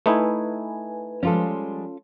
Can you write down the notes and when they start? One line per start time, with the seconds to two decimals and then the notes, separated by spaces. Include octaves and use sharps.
0.06 A3 D#4 E4 B4 G#5
1.23 F3 G3 G#3 C#4 F4 A4